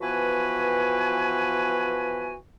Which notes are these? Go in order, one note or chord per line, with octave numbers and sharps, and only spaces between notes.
E3 F3 B3 F#4 B4 G#5